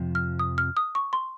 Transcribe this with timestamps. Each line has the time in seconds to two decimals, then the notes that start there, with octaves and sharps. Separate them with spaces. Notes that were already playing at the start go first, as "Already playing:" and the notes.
Already playing: F2 C3 F3
0.15 F6
0.39 D#6
0.58 F6
0.77 D#6
0.95 C#6
1.13 C6